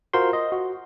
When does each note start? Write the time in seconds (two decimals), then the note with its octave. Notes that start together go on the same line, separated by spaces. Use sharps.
0.13 F4 F#4 A#4 C5 C6
0.33 D#5
0.52 F#4